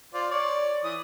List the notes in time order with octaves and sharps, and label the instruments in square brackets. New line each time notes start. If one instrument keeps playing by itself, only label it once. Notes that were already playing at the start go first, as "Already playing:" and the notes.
[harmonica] F4 C5 D5
C#5 D5
E3 D#6